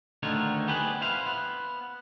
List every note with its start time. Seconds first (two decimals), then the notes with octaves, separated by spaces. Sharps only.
0.23 D2 D3 D#3 D#4 F4 C#5
0.68 B3 G4 G#4 B4
1.01 E4 B4 C5 F5
1.26 B3